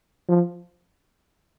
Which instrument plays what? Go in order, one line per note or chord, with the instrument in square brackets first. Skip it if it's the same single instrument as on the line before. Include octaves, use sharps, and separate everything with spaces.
[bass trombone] F3